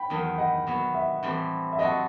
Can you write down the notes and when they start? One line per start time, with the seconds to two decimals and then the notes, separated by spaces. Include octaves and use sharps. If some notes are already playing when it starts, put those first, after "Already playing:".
Already playing: G5 B5
0.10 E2 D#3 F#3
0.38 D#5 F#5
0.67 B2 F#3 B3
0.95 E5
1.23 A2 E3 G3 C4
1.73 E5
1.79 F#3 C4 F#4 A4 D#5